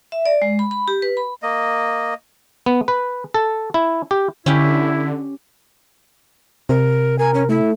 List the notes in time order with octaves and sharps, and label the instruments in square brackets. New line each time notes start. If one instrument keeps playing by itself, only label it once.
[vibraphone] E5
D5
G#3
B5
B5
G4
B4
B5
[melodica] A#3 D#5
[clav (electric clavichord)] B3
B4
A4
E4
G4
[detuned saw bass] D3 [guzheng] C#4 G4 [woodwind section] E4
[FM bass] C3 [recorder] A#4
[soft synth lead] A#4 [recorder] G#5
[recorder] C#4
[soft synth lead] A3 [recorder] E4